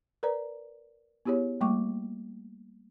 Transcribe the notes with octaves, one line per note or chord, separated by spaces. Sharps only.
A#4 B4 D5 A#5
B3 E4 G4 G#4 C#5
G3 A3 A#3 G5 C#6 D6